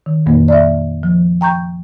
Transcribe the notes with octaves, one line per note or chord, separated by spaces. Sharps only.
D#3
F2 A#2 D#3 A#3
D5 E5
F3
G5 A#5 C#6 G6